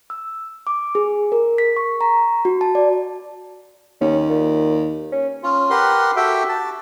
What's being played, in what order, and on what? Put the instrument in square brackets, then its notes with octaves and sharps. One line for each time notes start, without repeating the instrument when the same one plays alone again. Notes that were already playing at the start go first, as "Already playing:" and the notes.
[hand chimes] E6
D6
G#4
A#4
B6
C#6
A#5
F#4
A5
D5
[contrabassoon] D#2 [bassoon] C#4
[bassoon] A#2
C#4
[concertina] C#4 F4
G4 A#4 B4 F#5 C6
F#4 G4 A4 E5 G5
A5